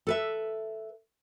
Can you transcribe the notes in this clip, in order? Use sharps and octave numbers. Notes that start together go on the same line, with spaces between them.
A4 B4 E5